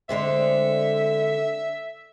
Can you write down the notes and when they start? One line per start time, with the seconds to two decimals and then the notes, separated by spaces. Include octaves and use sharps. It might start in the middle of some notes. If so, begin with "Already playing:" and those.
0.09 D3 G#3 C4 E5